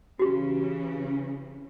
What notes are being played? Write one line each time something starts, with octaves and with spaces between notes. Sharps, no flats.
C#3 E3 C#4 F#4 G4